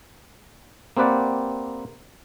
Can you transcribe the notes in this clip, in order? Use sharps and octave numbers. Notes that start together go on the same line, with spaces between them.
A#3 C4 G4 B4 D5 F#5